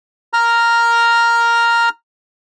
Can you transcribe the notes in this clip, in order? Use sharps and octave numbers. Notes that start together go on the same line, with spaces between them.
A#5 F6